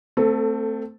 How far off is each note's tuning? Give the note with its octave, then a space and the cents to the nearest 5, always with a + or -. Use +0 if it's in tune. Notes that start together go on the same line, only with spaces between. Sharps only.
A3 +20 C4 -10 A4 +0